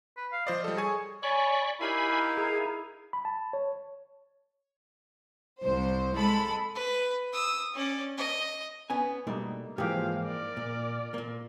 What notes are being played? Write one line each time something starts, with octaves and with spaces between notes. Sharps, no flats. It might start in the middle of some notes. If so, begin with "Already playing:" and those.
B4
F5
F3 C5 D5 D#5
G3 A4
G#4 C#5 G#5
C#5 D5 G#5 B5 C#6
D#4 E4 G4 A#4 F5 G#5 B5
G#4 A#5
B5
A5
C#5
C2 C5
G#3 A4 B5
B4
D#6 E6
C#4 D5
D#5
B3 C#4 G#5
B2 G3 A3 A#3 D#4
G#2 E3 F3 A#3 G4 F5
A#4 D5
A#2
A#2 A#3